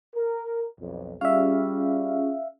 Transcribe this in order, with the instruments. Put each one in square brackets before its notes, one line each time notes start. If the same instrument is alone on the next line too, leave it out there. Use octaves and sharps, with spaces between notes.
[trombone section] A#4
B1 F2
[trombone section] G3 [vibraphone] C#4 F4 G#4 [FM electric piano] E5 F5